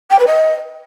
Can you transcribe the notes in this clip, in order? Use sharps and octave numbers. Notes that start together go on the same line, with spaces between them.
G5
B4
D#5